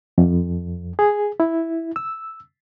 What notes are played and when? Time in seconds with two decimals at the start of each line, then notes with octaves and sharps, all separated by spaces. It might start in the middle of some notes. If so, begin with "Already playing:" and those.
0.18 F2
0.99 G#4
1.40 E4
1.96 E6